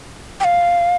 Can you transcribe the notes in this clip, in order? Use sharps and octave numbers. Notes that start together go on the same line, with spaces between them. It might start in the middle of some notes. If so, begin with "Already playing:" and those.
G5
F5